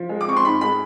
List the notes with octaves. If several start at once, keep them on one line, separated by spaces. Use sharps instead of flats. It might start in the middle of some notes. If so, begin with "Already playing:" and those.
Already playing: F3
G#3
D6
C4 C#6
C6
G#2 B5
G#3 B5